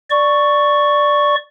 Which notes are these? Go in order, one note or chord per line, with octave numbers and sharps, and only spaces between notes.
D5 C#6